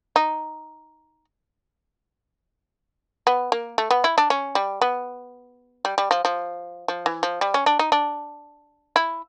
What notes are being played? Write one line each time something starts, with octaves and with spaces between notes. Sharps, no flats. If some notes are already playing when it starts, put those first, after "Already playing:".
D#4
B3
A#3
A3
B3
E4
D4
C#4
G3
B3
G3
G3
F3
F3
F3
E3
F3
G3
C#4
D4
D#4
D4
E4